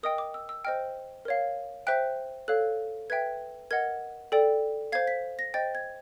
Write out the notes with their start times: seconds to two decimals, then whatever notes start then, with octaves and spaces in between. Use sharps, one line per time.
0.03 A#4 D#5 G5 D#6
0.18 D6
0.34 E6
0.49 E6
0.65 C5 D#5 G5 F6
1.25 A#4 C#5 F5
1.87 C5 E5 G5 F#6
2.48 A4 C#5 F5 F#6
3.10 B4 E5 G5 G#6
3.71 A#4 D#5 F#5 G#6
4.32 A4 D5 G5
4.92 C5 F5 G#6
5.07 B6
5.39 A#6
5.54 C5 D#5 G5 A6
5.75 G#6